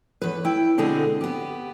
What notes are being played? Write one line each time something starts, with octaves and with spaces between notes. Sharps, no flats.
E2 B4
E4 G5
B2 D3 G#3 C4 G#4
B3 G4